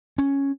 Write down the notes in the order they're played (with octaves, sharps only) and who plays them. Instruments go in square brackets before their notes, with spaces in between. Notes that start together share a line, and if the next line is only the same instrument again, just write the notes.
[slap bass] C#4